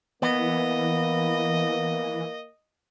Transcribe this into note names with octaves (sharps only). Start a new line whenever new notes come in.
E3 A#3 B3 D#5